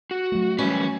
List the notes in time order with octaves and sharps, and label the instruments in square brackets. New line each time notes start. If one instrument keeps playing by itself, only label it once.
[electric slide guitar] F#4
[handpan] F#3 A3
[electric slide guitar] E3 G3 B4 [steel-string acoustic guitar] C#4